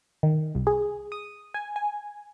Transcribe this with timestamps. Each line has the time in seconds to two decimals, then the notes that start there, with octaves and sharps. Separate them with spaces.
0.23 D#3
0.55 C2
0.67 G#4
1.12 D#6
1.54 G#5
1.76 G#5